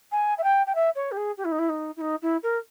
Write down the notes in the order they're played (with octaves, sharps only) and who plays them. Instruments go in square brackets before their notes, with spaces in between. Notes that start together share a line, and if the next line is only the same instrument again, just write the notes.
[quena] G#5
E5
G5
G5
E5
C#5
G4
G#4
G4
E4
D#4
E4
D#4
E4
D#4
E4
A#4